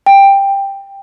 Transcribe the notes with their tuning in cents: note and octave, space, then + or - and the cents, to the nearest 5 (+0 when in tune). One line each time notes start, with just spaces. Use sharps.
G5 +10